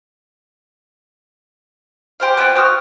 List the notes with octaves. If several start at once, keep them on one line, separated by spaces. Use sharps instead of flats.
G4 C5 F5
B3 C4 F4 G5
C4 F#4 D#6 F6